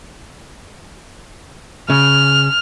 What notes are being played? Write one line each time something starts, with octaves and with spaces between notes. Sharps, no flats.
C#3 F6